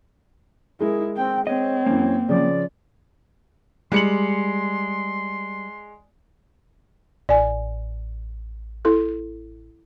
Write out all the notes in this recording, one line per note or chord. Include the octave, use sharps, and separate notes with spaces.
G#3 E4 G#4 A#4
C4 G5
C4 C#5 D#5
F#2 E3 A#3
C#3 F3 D5
G3 G#3 C6 C#7 F#7
A1 D5 G#5
E4 A4